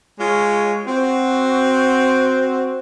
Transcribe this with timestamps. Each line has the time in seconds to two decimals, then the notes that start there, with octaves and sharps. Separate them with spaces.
0.19 G#3 F4 C#5
0.87 C4 F#4